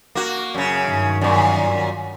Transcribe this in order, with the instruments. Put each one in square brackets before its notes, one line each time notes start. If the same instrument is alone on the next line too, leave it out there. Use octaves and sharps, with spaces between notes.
[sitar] A#3 F#4
F#2 C#3
[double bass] G2 D#3
[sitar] F#2 A#2